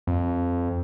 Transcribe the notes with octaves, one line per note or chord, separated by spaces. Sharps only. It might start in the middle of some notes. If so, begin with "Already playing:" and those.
F2